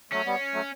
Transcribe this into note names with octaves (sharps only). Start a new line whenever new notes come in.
F#3 A3 C#4
G3 B3
F#3 A3